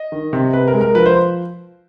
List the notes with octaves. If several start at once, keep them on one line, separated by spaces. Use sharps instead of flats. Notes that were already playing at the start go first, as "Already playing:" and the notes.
Already playing: D#5
D#3
C3
C3 B4
A#4
G#3
A#4
F3 B4
C5